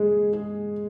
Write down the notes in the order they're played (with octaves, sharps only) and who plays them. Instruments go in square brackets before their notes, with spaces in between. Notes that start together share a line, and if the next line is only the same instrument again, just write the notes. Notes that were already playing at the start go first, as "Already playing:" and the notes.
Already playing: [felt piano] G#3 G#4
G#4